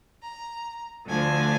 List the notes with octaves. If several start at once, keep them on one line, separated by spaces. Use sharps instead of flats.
A#5
D2 D3 F3 A3 D4 G#5